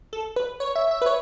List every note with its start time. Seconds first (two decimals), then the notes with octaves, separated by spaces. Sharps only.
0.13 A4
0.36 B4
0.60 C#5
0.76 E5
0.91 E5
1.02 B4
1.06 C#5